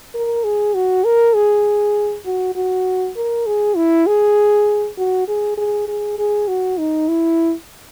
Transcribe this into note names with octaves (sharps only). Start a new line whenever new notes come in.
A#4
G#4
F#4
A#4
G#4
F#4
F#4
A#4
G#4
E4
G#4
F#4
G#4
G#4
G#4
G#4
F#4
D#4
E4